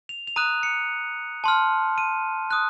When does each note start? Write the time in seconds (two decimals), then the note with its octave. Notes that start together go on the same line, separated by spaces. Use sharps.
0.09 F7
0.27 F7
0.36 A#5 D#6 F#6 D#7
0.63 C#7
1.44 A5 C6 F6
1.98 D#7
2.51 D#6 F#6